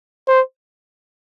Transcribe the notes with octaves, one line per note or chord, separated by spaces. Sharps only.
C5